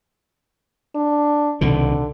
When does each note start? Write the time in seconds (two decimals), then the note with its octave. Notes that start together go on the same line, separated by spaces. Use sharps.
0.95 D4
1.61 C2 B2 D3 D#3